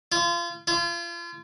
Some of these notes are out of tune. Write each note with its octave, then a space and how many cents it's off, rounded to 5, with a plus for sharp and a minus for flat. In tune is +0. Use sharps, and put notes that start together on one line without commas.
F4 -30
F4 -35